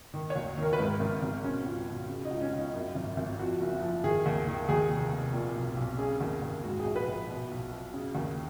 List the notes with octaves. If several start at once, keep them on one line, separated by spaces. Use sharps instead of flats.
D#3
C#5
D#2
D#3 A#4
B4
G#2 A#4
G#1
G#1
B2 C#4
C#2
B2
C#3
D#4
C#2
C#4
C#2
D#4
F#2
G#1
G#1
F2 F#4
F#1
F3
D#3 G#4
D#2
D#3
D#2 G#4
F1
F1
A#2
B1
B1
C#3 G#4
D#2
D#2
G#2 F#4
G#4
A#1
B4
A#1
B2
B1
B2
C#3
D#2